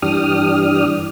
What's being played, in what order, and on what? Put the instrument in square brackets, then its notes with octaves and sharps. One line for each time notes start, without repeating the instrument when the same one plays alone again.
[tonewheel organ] G2 E3 D4 G4 D#6 F6